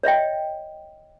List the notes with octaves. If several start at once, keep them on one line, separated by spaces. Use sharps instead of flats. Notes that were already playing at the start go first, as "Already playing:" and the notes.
C#5 D#5 E5 G5